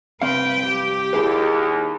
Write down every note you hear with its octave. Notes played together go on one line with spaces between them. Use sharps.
C2 C4 B4 F5 G5
G4
D#2 E4 G#4 B4